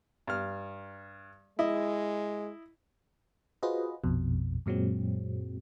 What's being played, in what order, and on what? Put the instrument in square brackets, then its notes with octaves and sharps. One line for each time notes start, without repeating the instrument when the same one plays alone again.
[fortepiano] G2 F6
[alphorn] G#3 [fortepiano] E4 D#5
[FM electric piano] F4 F#4 G#4 B4 C5 D#5
A#1 F2 B2
F#2 A#2 F#3 G#3 C4